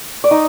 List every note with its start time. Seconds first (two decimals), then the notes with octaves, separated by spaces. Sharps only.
0.24 D5
0.31 D#4 D#5